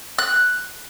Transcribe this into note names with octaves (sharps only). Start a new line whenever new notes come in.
F#6